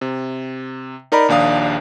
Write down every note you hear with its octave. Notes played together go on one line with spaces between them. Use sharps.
C3
D#4 A#4 D5 A#5 B5
A#1 D#2 D4 F5 D#6